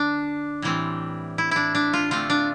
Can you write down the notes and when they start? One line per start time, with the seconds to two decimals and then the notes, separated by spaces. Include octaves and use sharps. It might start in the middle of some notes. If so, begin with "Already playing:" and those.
Already playing: D3 D4
0.62 A2 E3 G3 C4
1.38 E4
1.51 D4 E4
1.75 D4
1.93 F4
2.11 D3 A3 C4 F4
2.30 D4